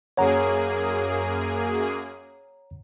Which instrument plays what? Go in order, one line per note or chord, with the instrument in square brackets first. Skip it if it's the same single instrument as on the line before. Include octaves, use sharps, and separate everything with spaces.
[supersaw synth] F#2 A#3 G#4 [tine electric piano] C#5 F#5 A#5